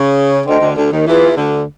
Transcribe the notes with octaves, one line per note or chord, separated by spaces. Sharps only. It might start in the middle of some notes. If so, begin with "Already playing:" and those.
Already playing: C#3
D2 D3 C5 D#5 G5 C6
D2 D3
D2 D3
D#2 D#3
E2 E3 F4 G#4 B4
D2 D3